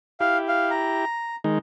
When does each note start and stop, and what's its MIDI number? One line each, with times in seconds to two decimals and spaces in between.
0.20 1.05 64
0.20 1.05 67
0.20 0.37 77
0.48 0.70 77
0.71 1.36 82
1.44 1.59 51
1.44 1.59 56
1.44 1.59 63